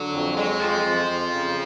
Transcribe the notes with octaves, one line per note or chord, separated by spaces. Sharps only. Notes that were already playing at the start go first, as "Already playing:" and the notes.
Already playing: D3 F#3
F2
F#3 G#3
F2 F3
F2
F2
C#3